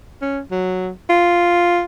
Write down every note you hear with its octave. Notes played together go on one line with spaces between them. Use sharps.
C#4
F#3
F4